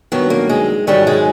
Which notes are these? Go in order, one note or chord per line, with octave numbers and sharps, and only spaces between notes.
G2 D#3 F#3 B3
A#3
G#3
G#2 D#3 F#3 G3
G#3